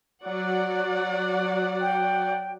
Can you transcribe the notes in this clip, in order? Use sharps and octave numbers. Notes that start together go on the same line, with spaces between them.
F#3 D5 F#5
G5